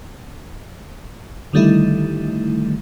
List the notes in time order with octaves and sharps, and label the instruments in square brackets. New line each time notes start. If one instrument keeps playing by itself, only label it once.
[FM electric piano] D3 D#3 G3 A3 D#4 E4